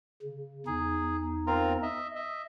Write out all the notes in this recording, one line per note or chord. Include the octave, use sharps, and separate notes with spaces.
C#3
E2 D#4 G#4
C4 F4 A#4
D#5 E5
D#5 E5